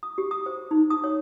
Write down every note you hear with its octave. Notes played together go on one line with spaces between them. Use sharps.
D#6
G4
D#6
C5
D#4
D#6
C#5